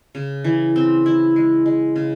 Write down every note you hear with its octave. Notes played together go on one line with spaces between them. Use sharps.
C#3
E3
C4
E4
G#3
G#3
C#3